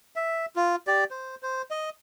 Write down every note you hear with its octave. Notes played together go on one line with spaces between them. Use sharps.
E5
F4
G4 D5
C5
C5
D#5